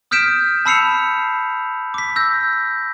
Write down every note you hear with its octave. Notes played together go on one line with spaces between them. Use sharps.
D#6 F6 G6 B6 D7 E7
A5 B5 E6 C7 C#7 F7
D6 B6
E6 G6 A#6